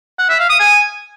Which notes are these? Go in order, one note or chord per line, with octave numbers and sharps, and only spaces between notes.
F#5
E5
F5
D#6
G#5